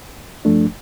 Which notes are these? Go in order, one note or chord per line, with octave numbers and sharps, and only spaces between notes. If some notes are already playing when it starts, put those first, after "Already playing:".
G2 F3 A3 D4